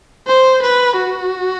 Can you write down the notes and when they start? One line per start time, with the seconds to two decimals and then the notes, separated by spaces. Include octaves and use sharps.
0.27 C5
0.62 B4
0.96 F#4